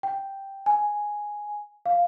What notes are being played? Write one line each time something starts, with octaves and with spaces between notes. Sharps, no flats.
G5
G#5
F5